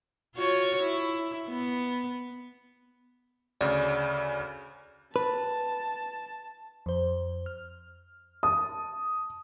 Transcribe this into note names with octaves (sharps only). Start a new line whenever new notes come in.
F4 F#4 C#5
E4
B3
D2 C#3 D5
B4 A5
F2 C5
F6
A5 D#6